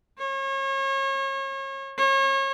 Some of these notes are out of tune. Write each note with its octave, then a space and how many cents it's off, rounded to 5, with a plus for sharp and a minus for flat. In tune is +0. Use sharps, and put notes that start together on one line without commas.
C#5 -35
C#5 -35